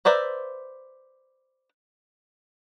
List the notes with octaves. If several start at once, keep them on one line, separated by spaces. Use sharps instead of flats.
B4 C5 D5 E5 A#5